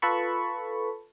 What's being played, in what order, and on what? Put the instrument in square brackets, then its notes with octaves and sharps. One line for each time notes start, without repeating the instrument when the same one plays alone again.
[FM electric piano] F4 A4 B4 A5 B5 C#6